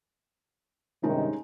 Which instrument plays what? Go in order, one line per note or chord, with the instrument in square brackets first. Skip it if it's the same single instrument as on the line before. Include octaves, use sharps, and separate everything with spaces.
[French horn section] G2 C3 D#3 [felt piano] G#3 C#4 D#4